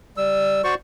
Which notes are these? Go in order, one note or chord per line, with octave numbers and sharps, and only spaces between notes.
G3 E6
F#4 C5 D5 C#6